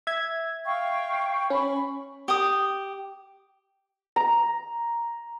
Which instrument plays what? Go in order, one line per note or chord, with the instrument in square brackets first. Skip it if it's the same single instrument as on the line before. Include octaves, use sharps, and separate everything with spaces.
[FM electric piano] E5 G#6
[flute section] F5 G5 C#6
[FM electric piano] C#4 [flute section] B5 C#6
[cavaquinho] G4 D#6
[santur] A#5